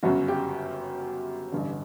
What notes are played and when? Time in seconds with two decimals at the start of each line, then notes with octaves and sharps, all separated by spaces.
0.03 G1 F#2 C#3 F#4
0.28 G4
1.52 A1 G2 D3